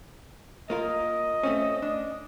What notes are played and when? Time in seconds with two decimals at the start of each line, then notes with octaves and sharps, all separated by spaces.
0.70 A#3 F4 A#4 D#5
1.43 A3 C4 C#4
1.82 D4